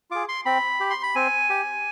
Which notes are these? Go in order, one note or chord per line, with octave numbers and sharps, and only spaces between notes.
F4 G#4 D6
C6
C4 B5
G4
C6
B5
C4 G#5
G4